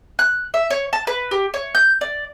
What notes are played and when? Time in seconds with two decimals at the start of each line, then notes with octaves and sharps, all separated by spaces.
0.19 F#6
0.54 E5
0.70 C#5
0.93 A5
1.07 B4
1.31 G4
1.54 C#5
1.75 G6
2.01 D5